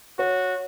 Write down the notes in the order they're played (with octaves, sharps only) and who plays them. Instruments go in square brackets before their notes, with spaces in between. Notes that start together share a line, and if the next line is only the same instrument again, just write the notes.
[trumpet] F#4 [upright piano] C#5